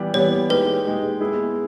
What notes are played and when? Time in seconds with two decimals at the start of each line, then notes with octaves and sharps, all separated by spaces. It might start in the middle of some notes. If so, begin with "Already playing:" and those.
Already playing: E3 G3 B3 G4
0.14 E3 G3 B3 G4 C#5
0.49 G#3 D#4 G4 B4
0.85 G#3 D#4 G4
1.20 G#3 B3 E4 G#4